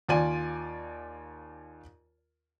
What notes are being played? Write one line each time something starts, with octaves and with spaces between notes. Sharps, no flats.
D#2 F4 D5 G#5 D#7